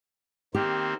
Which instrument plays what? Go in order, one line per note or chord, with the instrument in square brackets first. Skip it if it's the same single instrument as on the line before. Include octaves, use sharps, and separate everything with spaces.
[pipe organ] D#3 A#3 C4 [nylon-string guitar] G4